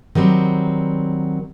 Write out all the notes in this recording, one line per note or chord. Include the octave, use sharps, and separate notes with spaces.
D#3 F#3 G3 C4